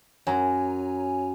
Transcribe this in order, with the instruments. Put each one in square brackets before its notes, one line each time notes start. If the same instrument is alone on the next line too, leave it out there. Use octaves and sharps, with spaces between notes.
[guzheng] F#2 [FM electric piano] C#5 G#5 A#5